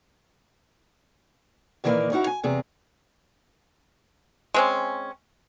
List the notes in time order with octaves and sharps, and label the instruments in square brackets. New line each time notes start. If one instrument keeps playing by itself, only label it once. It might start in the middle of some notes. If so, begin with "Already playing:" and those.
[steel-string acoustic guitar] A#2 D#3 E3 G3 A#3
C#4 D#4 E4 F#4
G#5
E2 C3 G#4
[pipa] G#3 C4 C#4